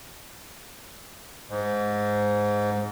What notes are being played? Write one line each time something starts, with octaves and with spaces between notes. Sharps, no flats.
G#2